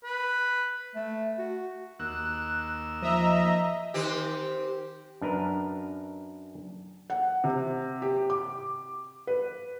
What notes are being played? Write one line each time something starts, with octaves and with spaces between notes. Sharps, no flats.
B4
A3
F#4
D#2 A#3 E6 F#6
F3 D#5 E5 A#5
D#3 C4 G4
F#2 D4 A#4 B4 A#5
F#5
C3
G4
D6
B4